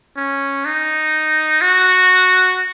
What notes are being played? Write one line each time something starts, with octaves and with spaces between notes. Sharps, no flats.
C#4
D#4
F#4